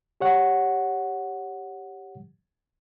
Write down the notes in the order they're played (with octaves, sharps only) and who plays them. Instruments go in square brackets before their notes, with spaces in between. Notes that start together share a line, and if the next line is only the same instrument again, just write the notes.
[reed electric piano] G4 C#5 F#5